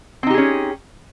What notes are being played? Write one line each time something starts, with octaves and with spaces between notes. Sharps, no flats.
C4 C#4 D#4 G4 G#4